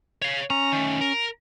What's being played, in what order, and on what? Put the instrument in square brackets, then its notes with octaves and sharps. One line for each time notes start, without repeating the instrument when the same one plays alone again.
[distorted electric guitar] C#5 F5
[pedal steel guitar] C#4 [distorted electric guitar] A#5
[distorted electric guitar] D#3 A3
A#4